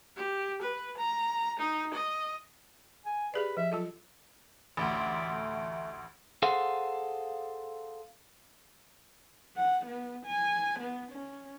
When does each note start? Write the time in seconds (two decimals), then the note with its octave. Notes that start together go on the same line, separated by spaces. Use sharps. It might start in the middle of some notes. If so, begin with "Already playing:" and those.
0.17 G4
0.62 B4
0.97 A#5
1.59 D#4
1.94 D#5
3.05 G#5
3.34 G4 G#4 B4 D5
3.57 F3 E5
3.72 F#3 F4 A4 D#5
4.77 A1 D2 D5 E5
5.30 A3
6.42 G#4 A4 C5 F5 F#5
9.57 F#5
9.86 B3
10.26 G#5
10.80 B3
11.12 C#4